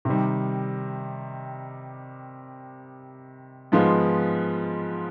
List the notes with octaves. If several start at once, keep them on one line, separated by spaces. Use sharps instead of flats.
C3 D#3 G3
G#2 F3 G#3 B3 F4